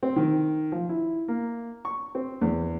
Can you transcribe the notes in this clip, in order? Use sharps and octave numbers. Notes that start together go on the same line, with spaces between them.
C4
D#3
F3
E4
A#3
C#6
C4
E2